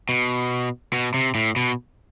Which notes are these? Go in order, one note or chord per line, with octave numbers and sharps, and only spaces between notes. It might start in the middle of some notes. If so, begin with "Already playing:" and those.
B2
B2
C3
A2
B2